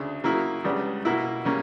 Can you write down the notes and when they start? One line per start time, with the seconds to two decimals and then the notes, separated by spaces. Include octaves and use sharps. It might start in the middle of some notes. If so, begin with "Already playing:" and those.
Already playing: D2 C#3 D4
0.24 C#3 F#3 A#3 E4 A#4
0.64 C#2 C#3 G3 B3 D4
1.05 B2 A#3 E4
1.45 C#3 G3 A#3 C#4